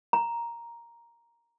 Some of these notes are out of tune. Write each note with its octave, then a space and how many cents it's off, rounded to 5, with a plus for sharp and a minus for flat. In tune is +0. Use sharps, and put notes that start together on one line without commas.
A#5 +5